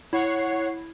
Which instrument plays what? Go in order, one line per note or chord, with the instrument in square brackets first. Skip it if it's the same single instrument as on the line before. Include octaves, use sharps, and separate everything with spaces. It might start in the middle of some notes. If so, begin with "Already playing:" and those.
[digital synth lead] E4 [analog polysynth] C#5 F#5 C7